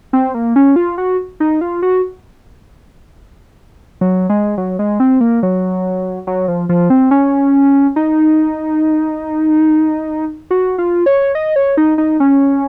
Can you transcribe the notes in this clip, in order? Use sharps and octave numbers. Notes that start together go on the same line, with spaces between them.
C4
A#3
C#4
F4
F#4
D#4
F4
F#4
F#3
G#3
F#3
G#3
C4
A#3
F#3
F#3
F3
F3
C4
C#4
D#4
F#4
F4
C#5
D#5
C#5
D#4
D#4
C#4